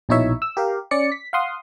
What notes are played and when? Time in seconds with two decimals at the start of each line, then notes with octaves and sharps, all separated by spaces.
0.09 A#1 B2 D#4 E4 C#5 E5
0.42 E6
0.57 G4 A#4 F5
0.91 C#4 D5 C#7
1.12 B6
1.33 F5 F#5 C6 D#6